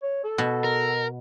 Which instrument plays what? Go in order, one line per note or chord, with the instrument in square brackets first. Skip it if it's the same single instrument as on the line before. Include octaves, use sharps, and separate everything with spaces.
[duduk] C#5
A4
[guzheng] B2
[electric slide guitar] A#4